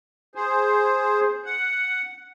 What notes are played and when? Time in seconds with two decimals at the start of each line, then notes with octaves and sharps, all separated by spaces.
0.35 G#4 C5
1.45 F#5